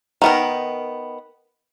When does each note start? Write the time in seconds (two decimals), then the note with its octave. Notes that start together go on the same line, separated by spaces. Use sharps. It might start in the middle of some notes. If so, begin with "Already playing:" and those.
0.22 D#3 B3 A#4